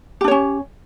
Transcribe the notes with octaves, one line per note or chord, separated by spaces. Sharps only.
C#4 D4 G4 C#5